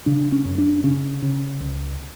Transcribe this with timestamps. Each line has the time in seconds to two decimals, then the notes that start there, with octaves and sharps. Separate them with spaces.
0.06 C#3 D4
0.32 C#4
0.45 F#2
0.58 D4
0.84 C#3 C#4
1.22 C#3
1.60 C#2